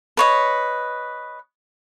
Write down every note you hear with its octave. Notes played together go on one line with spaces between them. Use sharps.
B4 C#5 D#5